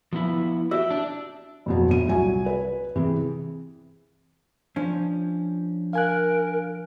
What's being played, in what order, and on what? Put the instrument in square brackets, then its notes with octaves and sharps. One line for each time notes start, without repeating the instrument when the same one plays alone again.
[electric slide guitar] F3 B3 E4
[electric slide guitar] F#4 G4 [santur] E5
[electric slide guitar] D4
[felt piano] F2 B2 F#3
A#1 D#7
C2 F#3 G#5
B4
C3 E3 G#4
[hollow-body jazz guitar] F3 C#4 [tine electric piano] D4
[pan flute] A#4 [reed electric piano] F5 G#5 F#6